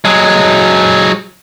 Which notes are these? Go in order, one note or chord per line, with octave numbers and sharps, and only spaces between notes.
F#3 G#3